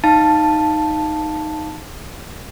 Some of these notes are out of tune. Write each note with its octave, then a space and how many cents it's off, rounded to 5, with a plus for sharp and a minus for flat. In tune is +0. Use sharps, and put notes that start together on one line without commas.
D#4 +0 F5 +0 A5 +0